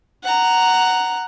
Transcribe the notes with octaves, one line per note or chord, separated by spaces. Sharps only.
F#5 A#5